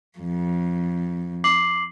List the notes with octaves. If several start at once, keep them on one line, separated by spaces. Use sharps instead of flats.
F2
D6 C7 F#7